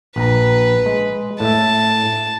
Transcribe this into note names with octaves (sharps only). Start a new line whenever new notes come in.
A#1 B4 A#5
G#3
A2 E5 A5